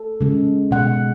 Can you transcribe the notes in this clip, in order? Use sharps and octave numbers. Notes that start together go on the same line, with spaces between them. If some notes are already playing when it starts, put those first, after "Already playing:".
Already playing: A4
C#3 G#3
B2 G#3 F#5